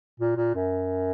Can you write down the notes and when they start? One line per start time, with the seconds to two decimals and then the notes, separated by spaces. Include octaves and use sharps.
0.20 A#2
0.36 A#2
0.55 F#2